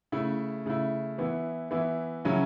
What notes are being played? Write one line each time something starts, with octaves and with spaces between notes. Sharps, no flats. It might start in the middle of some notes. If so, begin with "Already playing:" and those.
C#3 A3 E4
C#3 A3 E4
E3 B3 E4
E3 B3 E4
C#3 F#3 C#4 E4